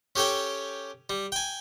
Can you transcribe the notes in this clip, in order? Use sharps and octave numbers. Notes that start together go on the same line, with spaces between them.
C#4 G4 A4 C#5 G5
G3
G5 G#5